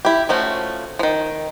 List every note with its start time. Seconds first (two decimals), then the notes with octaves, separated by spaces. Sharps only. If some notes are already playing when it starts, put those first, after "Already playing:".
0.05 E4 G4
0.29 F3 A3 C#4 F#4
0.99 D#3 F3